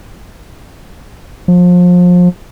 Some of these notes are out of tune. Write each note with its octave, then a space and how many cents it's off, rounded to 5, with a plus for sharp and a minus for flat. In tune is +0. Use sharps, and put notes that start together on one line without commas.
F3 +30